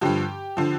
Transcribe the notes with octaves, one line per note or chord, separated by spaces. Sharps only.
G2 D3 F3 G4
D3 F3